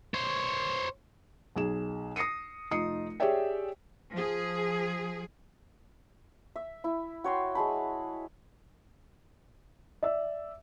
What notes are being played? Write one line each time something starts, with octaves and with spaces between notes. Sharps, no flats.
C5 C#5
B1 G#4 E7
D#6 A#6 C7 C#7 D#7
F1 D#4 F4 D#6 C7 C#7
G4 G#4 C#5 D5 E5 G5
F3 G#4
E5
E4
F#4 C#5 G5 C6
G#3 G#4 A5 B5
D5 E5 E6